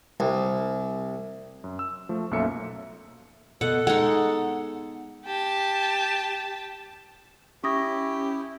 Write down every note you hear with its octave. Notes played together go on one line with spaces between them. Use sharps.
C2
F#2
E6
F3 A3
B1 F#2 A#3 A4 E5 C#7
B2 A4 F#5
G#3 D#4 F#5
G4 A5
C#4 E4 G4 C#6 D#6 A#6